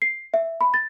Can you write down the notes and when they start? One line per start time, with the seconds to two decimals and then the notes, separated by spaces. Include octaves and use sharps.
0.02 C7
0.34 E5
0.61 B5
0.74 A6